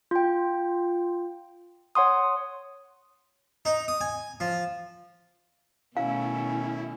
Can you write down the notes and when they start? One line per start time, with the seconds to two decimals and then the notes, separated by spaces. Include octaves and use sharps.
0.11 F4 G5
1.95 C#5 F#5 C6 D#6
3.65 D#4
3.88 D#6
4.01 G#5
4.40 F3
5.97 B2 D#3 A3 C#4 E4 F5